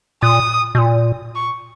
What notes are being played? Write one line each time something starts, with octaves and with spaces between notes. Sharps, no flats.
A#2 D#6
B2
A#2
C#6